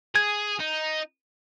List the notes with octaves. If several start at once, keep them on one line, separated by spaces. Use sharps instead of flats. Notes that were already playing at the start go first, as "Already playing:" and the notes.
G#4 G#6
D#4